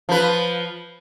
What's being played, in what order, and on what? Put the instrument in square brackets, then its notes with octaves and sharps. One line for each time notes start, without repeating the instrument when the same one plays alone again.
[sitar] F3 B4